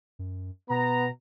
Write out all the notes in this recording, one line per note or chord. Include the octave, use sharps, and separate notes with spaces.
F#2
B2 B3 A#5